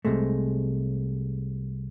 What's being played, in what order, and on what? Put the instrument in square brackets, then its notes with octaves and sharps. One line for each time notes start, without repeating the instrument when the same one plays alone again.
[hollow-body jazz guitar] C2 G2 C3 G#3 A3